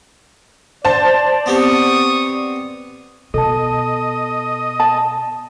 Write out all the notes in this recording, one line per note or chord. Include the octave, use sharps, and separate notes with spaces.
C5 D5 A5
B3 C4 G4 C#6 D#6
B2 A4 D#5 A5
A5